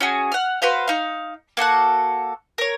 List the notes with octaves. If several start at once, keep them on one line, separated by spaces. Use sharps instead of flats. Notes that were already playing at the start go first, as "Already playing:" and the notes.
C#4 F#4 G#4
F#5 F6
F#4 B4 C5 F5
D#4 F5
A#3 F#4 A4 F#5
A#4 C#5